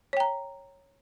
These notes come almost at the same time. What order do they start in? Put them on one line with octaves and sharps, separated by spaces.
C#5 G5 A#5